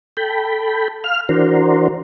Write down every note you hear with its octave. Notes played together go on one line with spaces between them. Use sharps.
A4 G5 B5
F5 F6
E3 D4 F#4 A#4 C5